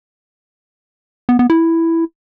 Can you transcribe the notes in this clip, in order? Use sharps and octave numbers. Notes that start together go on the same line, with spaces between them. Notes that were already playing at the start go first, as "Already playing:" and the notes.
B3
B3
E4